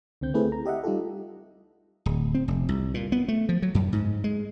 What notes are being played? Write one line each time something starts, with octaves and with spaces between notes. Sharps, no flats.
C#2 D3 C4 G6
A3 C4 E4 G#4 B4
A#5
G4 D#5 E5 F#5
G3 D#4 F4 G4 A4
D1
C4
F1
C2
A#2
B3
A3
F3
F#3
F#2
G#2
G#3